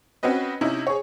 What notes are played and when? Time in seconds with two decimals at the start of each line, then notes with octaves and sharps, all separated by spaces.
0.23 C4 C#4 F#4 B4 D#5
0.61 C3 C#4 D#4 E4
0.87 G#4 C#5